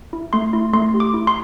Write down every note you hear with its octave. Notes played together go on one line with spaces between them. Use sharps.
E4
A3 C6
E4
A3 C6
G4
D6
E4
C6